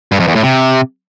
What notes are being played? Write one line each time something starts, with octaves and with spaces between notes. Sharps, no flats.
G2
F2
E2
A2
C3